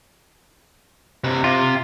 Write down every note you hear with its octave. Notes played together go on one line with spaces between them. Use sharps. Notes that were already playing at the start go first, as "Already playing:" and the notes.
C3 B4
C3 F4